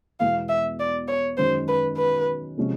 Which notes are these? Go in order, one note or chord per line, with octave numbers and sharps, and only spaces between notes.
E2 B2 G#3 B3 E4 F5
E5
D5
C#5
F#2 D#3 G#3 C#4 C5
B4
B4
C3 F3 G#3 C#4